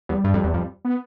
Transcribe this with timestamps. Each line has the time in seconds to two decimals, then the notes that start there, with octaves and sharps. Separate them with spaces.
0.09 E2 G3
0.24 G2
0.34 F2
0.44 E2
0.54 F2
0.85 B3